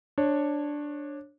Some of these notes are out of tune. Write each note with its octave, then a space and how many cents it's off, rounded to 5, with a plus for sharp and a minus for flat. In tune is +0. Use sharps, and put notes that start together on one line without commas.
D4 +0 C#5 -20